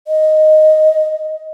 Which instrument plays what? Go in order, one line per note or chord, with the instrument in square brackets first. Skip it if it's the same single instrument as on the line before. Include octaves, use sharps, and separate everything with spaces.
[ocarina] D#5